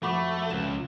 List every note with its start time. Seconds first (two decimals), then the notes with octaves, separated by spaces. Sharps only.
0.03 F2 A3 F#4 B5 C#6 D6
0.50 C#2 E7